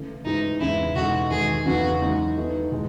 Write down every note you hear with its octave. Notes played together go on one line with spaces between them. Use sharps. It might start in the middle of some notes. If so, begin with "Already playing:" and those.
Already playing: C#3 E3 A3 C#4
G#2 E3 G#3 D#4
E2 C#3 G#3 C#4 E4
B2 G#3 D#4 F#4 A4
E2 D#3 G#3 D#4 G#4 A4
E2 C#3 F#3 B3 D#4 F#4
E3 G#3 D#4 G#4
E3 B3 D#4 A4
B2 G#3